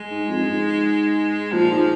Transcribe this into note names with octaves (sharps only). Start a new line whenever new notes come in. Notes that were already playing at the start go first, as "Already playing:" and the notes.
Already playing: G#3
G#2
F2
G#2
A#2 F3
G#2